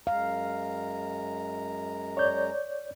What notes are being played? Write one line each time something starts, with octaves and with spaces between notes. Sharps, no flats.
F#2 G#3 F5 A#5
C#5 D5 G6